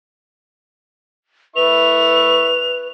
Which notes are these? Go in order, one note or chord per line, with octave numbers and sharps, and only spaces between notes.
E4 B4 E5 C#6 F7